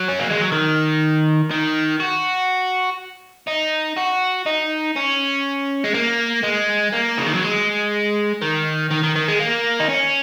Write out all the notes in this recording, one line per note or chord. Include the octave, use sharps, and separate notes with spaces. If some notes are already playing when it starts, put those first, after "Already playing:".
Already playing: F#3
C#4
A#3
G#3
F#3
D#3
D#3
F#4
D#4
F#4
D#4
C#4
G#3
A#3
G#3
A#3
C#3
D#3
F#3
G#3
D#3
D#3
D#3
D#3
G#3
A#3
D#4
C#4